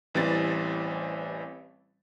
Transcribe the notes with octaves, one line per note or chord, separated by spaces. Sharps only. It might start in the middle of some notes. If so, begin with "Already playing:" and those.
A1 E3 G3 C4 A6